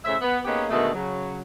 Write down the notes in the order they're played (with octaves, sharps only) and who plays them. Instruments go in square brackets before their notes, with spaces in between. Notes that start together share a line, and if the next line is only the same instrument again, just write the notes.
[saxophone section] A2 C#3 C5 E5
B3
A#3 B3 C#4 D#4 G4 G#4
B2 D3 D#3 G#3 A3
C#3 F#3